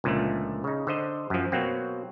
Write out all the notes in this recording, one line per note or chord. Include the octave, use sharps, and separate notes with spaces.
C#2 A#2 D3 F3 A3
C#3 D#4
D3 C5 D#5
F#2 F3
B2 F#3 A#3 C4